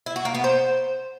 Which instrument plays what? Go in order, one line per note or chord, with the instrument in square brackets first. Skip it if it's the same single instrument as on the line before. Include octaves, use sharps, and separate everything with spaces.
[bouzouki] E4
F#4
A#3
B3
C5